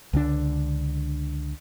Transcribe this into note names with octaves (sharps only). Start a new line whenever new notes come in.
C#2 D3 D4